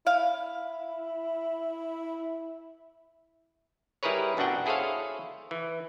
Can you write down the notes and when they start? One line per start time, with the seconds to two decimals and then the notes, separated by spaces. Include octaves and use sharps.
0.07 E4 F5
4.03 G3 E4 G#4 A#4 B4 C#5
4.37 B1 F#2 D4 F#4 F#5 G5
4.66 E4 G#4 A4 C5 C#5 F5
5.51 E3